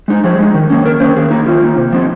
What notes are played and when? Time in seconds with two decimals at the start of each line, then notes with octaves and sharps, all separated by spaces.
0.08 G#3 D#4
0.24 F3 G#4
0.39 G#3 D#4
0.54 D#3
0.70 F#3 A#3 C#4
0.84 D#3 A#4
1.00 F#3 A#3 C#4 C5
1.16 D#3 G#4
1.31 A#3 D#4
1.46 D#3 F4
1.62 A#3 D#4
1.77 C3
1.93 F3 C4 D#4